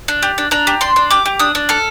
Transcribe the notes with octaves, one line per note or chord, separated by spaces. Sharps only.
D4
G4
D4
D4 A#5
G4
D4 C6
D4
G4 D6
G4
D4 D#6
D4
A4 F6